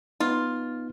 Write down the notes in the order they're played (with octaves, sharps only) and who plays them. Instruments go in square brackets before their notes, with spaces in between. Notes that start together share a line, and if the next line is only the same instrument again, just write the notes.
[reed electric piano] B3 D#4 [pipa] F4